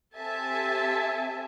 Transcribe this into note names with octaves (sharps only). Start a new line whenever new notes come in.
C4 G4 A4 E5 G#5 A5